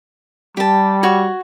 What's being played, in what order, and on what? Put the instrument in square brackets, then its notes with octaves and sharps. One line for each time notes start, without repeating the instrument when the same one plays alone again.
[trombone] G3 [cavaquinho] G4 A5
[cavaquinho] F#4 C#5 C#6